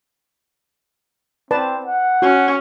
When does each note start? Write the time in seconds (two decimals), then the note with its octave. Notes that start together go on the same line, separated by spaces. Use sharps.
1.51 C4 B4 D5 A5
1.86 F#5
2.22 C#4 F#4